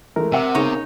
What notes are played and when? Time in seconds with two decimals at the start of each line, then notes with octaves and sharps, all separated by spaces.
0.16 E3 G#3 A3 A#4
0.32 C3 E5 F#5 E6
0.55 C#3 B3 D#4 G#4 C#5